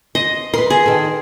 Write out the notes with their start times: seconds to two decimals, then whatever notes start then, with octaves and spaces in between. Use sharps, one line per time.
0.15 C5 D#5
0.54 A#4 B4 C6
0.70 G#4
0.86 D#3 A4